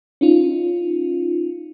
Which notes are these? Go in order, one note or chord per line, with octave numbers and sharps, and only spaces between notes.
C#4 D#4 F4